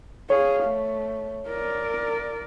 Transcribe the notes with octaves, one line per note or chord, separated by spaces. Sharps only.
G#4 C#5 F5
A3
A#4 D5